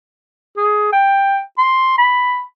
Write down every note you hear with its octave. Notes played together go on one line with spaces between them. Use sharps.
G#4
G5
C6
B5